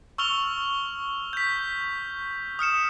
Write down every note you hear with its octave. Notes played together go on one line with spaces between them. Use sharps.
C#6 E6 F6 F7 G7
G6 B6
D#6 F6 C#7 E7